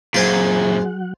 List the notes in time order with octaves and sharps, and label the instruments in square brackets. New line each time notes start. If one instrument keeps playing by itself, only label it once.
[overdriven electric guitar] F#2 A#2 [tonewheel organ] F#3 F#5 [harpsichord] F4 C5 G#5 [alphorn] G#4